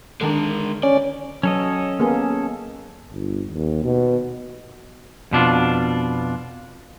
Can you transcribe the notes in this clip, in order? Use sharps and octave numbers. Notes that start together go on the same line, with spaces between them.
D3 D#3 G#3 D4 A#4
C#4 D5
F#3 C#4 A4 D#5
A#3 B3 G#4
G1
D#2
B2
F2 B2 D4 F4